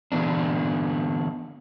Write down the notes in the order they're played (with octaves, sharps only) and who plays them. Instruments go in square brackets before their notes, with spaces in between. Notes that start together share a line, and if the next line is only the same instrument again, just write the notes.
[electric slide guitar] D3 E3 B3 D4